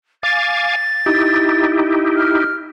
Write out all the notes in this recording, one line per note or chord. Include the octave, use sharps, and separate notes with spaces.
F5 G#5 D6 A6
D#4 E4 G4
F6